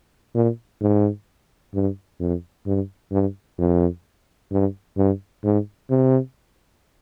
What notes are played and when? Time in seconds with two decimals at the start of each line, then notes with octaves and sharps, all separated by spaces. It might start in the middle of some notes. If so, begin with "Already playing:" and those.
0.35 A#2
0.81 G#2
1.74 G2
2.20 F2
2.66 G2
3.12 G2
3.58 F2
4.52 G2
4.97 G2
5.44 G#2
5.90 C3